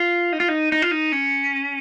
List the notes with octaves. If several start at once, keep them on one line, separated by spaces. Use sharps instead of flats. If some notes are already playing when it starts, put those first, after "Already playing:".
Already playing: F4
D#4
F4
D#4
D#4
F4
D#4
C#4